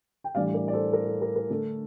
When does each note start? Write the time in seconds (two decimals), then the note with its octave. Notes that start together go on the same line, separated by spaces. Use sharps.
0.24 G5
0.35 A2 E3 G3 D4 D5 F5
0.54 A#4 D5
0.68 D5
0.73 A4 C5
0.93 A#4
1.07 A4
1.22 A#4
1.36 A#4
1.50 D3 A3 D4 A4